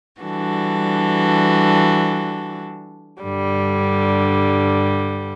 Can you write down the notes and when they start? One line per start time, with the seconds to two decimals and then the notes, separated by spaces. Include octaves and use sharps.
0.21 E3 G3 D4 F#4 A4
3.22 G2 D3 G3